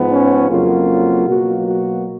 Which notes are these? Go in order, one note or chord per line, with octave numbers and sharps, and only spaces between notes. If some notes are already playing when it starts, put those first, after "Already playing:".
Already playing: G#2 F3 B3
C#4
F2 C#3 F#3 A#3 F4
B2 F#3 A#3 F#4
F#4